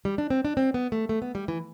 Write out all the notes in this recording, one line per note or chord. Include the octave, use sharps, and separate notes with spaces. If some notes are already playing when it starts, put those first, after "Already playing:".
G3
D4
C4
D4
C4
B3
A3
A3
B3
G3
E3